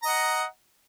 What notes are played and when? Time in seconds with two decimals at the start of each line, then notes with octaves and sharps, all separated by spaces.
0.03 A#5
0.05 D#5
0.08 F#5